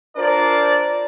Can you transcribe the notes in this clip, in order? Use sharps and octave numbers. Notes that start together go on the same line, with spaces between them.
D4 F4 A#4 C5 D5